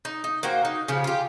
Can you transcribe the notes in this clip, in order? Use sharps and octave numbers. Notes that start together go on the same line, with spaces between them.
D#4
D#4
A#3 F#4 C5 G5
D#4
C#3 F3 G4
F4 G4